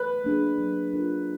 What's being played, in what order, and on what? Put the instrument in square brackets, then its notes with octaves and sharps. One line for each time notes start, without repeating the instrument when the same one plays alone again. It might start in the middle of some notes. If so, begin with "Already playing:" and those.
Already playing: [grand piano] B4
[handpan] F#3 A#3 D4 G#4
F#3
D4 F4 A#4